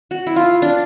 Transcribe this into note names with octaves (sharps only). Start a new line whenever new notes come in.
F#4
E4
F4
D4